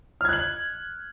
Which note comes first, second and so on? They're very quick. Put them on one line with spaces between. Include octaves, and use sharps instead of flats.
F6 G#6 F#6 F#7